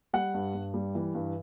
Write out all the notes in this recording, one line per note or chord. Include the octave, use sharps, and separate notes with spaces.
G3 F#5
G2
G2
G3
E3
G2